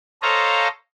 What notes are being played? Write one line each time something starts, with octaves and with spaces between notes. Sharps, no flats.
A4 C5 C#5 D#5 F5 A#5